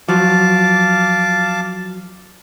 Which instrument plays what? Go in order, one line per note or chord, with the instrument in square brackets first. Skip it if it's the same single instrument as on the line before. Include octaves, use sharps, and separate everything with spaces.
[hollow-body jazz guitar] F3 F#3 [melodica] F5 A5 D6